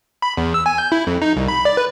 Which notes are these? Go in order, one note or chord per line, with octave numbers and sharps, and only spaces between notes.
B5
E2
E6
G#5
G6
E4
F2
D#4
C2
B5
D5
B4